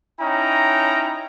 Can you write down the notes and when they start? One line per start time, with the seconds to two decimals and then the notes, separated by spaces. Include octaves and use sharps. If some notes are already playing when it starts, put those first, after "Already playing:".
0.20 C#4 D#4 E4 G5 A#5